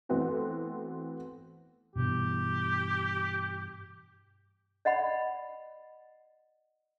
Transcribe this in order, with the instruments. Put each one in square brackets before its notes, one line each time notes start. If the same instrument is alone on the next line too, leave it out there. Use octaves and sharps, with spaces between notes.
[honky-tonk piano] E3 A3 B3 C4 F#4 A4
[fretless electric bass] G2 B2 E3 [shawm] G4
[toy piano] D5 D#5 F#5 B5